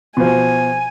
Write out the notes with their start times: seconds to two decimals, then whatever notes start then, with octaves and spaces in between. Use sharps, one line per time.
0.17 B2 F3 G#5